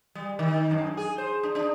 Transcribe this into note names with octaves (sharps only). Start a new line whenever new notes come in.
G3
D#3
F#2
G#4
C5
D4
D4